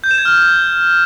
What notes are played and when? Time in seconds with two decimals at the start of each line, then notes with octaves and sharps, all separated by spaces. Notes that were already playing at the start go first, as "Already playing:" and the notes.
0.04 G6
0.11 E7
0.18 G#6
0.25 F6